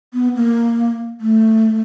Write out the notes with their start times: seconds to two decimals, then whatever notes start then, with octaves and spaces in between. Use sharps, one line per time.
0.14 B3
0.35 A#3
1.21 A3